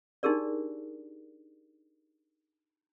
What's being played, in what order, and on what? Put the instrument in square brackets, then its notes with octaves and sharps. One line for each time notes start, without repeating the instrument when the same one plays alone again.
[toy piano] D4 D#4 G4 G#4 A#4 D5